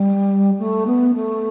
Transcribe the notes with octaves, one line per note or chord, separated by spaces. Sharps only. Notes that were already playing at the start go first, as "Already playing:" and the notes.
Already playing: G3
A3
B3
A3